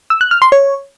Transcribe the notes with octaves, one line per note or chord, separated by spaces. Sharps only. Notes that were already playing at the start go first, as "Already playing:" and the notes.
E6
F#6
F6
C6
C#5